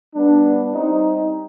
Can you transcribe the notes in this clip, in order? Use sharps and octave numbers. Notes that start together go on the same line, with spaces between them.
G3 B3 D4
G3 C4 D#4